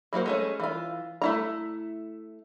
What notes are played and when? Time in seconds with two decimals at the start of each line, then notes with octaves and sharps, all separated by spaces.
0.13 F#3 A#3 F#4 C5
0.26 G#3 A3 C#4
0.60 E3 F4
1.22 A3 E4 A#5